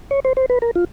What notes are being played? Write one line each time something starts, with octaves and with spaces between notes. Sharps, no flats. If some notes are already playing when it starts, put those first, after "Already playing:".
C#5
C5
C5
B4
A#4
F4